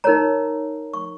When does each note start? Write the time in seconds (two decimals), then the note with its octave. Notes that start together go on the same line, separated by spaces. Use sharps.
0.04 D#4 A#4 C#5 A#5
0.94 C#6